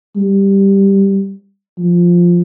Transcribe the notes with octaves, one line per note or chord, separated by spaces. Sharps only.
G3
F3